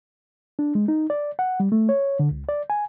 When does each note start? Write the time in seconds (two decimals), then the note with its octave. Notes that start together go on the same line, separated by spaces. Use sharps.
0.59 D4
0.75 G#3
0.88 D#4
1.10 D5
1.39 F#5
1.60 G3
1.72 A3
1.89 C#5
2.19 D3
2.31 C#2
2.49 D5
2.70 G#5